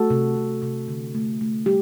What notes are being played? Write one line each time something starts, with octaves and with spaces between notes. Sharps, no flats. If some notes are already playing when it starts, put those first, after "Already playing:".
Already playing: A3 F#4 A4
C3
C3
C3
D3
A3
A3
G3 G4